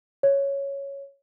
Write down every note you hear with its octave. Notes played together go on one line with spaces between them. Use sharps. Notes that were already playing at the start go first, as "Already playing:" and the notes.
C#5